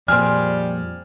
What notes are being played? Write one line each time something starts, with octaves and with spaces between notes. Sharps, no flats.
F2 A#2 G3 C4 G#4 F6